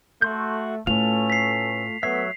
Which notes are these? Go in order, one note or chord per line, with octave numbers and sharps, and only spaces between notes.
A3 F#4 C6 G6
A2 A3 C#4 F4 A4 B4 F7
B6 C7
F#3 A3 B3 C#5 E5 C7